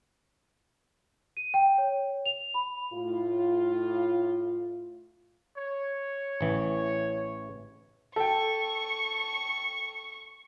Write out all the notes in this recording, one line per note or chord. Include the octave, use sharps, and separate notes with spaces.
D#7
G5
C#5
F7
B5
A2 F4
C#5
A1 E3
A4 G5 C#6